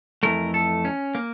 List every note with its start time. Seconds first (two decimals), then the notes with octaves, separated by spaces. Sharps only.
0.23 F2 E3 A3 A#4
0.54 A4
0.85 C#4
1.15 A#3